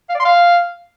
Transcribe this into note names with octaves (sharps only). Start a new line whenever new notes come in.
F5
D5
C6
F5